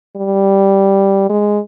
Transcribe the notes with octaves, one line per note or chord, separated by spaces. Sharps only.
G3
G#3